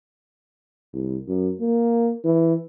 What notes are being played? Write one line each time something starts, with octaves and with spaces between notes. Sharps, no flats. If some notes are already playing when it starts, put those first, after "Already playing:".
C2
F#2
A#3
E3